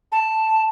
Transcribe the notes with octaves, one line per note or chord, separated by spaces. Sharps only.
A5